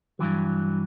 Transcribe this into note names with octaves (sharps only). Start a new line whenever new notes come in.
G2 B2 E3 F#3